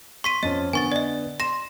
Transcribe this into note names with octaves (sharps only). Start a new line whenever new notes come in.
C6 C#6 B6 D#7
F2 C#4 D#5
D3 B3 G#5 C#6 A6
D5 D#5
C6 A#6 E7